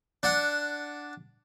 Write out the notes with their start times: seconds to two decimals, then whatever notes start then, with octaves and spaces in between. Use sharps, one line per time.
0.23 D4 F#5